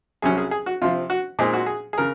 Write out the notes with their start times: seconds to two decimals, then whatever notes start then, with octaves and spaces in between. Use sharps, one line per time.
0.22 C2 C3 F#3 C#4 G#4
0.38 G#4
0.51 G#4
0.66 F#4
0.82 C3 F3 C4 F4
1.10 F#4
1.39 A#2 G#3 C4 D#4 G#4
1.53 F#4
1.66 G#4
1.93 G#4
1.98 C#3 A#4